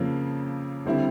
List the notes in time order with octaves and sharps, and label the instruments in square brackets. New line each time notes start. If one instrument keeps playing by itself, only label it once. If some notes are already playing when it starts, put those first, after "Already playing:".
Already playing: [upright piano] F2 C#3 F3 A#3 C#4
D3 G3 C4 E4